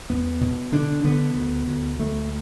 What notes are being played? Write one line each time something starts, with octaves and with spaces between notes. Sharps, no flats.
E2 B3
B2
D3 D4
D3 B3
D2
D2
D2 A3